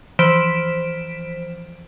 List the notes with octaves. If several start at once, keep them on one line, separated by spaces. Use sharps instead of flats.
E3 F3 C5 B6 D7 E7